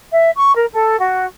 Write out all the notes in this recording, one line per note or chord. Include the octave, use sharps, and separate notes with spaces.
E5
C#6
A#4
A4
F#4